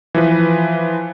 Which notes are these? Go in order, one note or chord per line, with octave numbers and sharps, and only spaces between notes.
E3 F3 B4